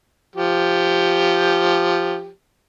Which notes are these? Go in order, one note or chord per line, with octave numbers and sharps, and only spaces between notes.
F3 G4